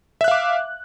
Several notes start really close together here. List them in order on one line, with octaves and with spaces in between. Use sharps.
E5 F#6 F5 D6